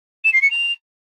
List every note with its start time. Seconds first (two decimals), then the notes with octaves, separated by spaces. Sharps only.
0.24 E7
0.33 C7
0.42 C#7
0.50 F7